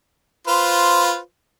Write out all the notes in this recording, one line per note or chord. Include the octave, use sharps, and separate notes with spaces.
F4 B4 C5